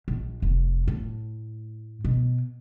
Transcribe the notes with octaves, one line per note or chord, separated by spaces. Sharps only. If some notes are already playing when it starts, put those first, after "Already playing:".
A#1
F1
A2
B2